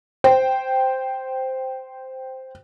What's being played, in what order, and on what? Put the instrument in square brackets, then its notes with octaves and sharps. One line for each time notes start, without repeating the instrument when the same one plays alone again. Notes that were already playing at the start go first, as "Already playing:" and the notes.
[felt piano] C5 G5